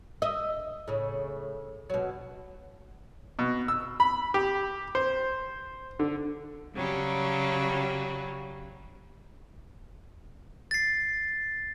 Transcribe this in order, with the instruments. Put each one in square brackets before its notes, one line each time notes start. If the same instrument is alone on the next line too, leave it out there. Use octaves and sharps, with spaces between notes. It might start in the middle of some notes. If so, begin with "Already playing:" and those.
[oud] D#5 E5
A2 C#3
B2 F#3
[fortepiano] B2
E6
B5
G4
C5
D3
[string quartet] C#3 F#3 G3
[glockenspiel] A6 C7